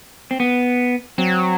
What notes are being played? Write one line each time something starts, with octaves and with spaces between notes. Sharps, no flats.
C4
B3
F#3 C4